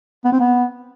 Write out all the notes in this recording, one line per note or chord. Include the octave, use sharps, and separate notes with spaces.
B3
C4
B3